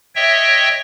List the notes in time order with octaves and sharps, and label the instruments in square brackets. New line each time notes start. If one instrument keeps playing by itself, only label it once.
[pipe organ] C#5 D#5 E5 G5